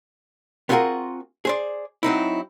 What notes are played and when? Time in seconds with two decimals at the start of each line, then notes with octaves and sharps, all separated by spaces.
0.69 B3 C4 F4 F#4 G#4 A#4
1.45 G#4 C5 D5
2.03 F#3 C4 D#4 E4